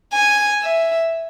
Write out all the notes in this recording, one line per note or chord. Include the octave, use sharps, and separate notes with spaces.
G#5
E5